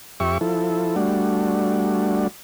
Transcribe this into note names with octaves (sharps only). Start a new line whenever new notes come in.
F2 G4 E5 C#6
F3 E4 A4
G3 A3 D4 F#4